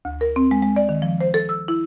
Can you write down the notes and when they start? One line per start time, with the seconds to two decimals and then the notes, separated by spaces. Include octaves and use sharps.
0.05 D2
0.21 A#4
0.36 C4
0.51 G#3
0.62 G#3
0.76 D5
0.89 D#3
1.02 F3
1.21 C5
1.34 A4
1.49 E6
1.68 E4